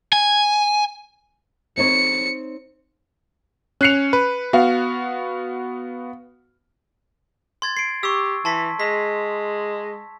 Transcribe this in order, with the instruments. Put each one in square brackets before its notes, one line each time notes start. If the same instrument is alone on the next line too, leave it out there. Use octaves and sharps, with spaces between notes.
[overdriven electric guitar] G#5
[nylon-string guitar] C4 D#4 C#5 [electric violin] C#7
[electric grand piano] C#4 C#7 [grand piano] F#6 C7 F7
[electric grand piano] B4
[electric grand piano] B3 F#4 [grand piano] F5
[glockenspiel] C6 G#6 A6
C7 D7
[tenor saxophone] G4 [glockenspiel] C#6 E6
[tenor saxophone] E3 [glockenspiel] A5 C6 B6
[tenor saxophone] G#3 [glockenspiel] B6